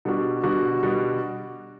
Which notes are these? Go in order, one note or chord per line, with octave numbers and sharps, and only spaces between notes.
B2 G3 D4 F#4
B2 G3 D4 F#4
B2 G3 D4 F#4